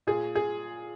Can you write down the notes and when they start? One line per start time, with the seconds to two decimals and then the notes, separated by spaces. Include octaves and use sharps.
0.07 A#2 G#4
0.35 G#4